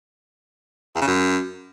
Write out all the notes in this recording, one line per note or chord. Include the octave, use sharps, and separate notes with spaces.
E2
C#3
F#2